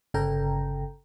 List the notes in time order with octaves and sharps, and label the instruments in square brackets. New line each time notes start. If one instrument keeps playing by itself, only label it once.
[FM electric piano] G1 C#3 A4 G5 A#5